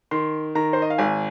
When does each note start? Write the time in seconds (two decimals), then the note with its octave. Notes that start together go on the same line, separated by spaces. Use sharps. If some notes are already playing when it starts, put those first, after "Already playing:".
0.11 D#3 C6
0.55 D#3 A#5
0.73 C5
0.82 D#5
0.90 F5
0.98 G#1 G#5